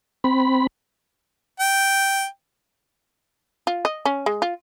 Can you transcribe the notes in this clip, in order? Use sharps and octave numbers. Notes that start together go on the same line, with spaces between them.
C4 B5
G5
F4
D#5
C#4
G#3
F4